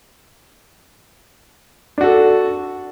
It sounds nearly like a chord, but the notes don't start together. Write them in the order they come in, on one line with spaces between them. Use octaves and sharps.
D4 F#4 A4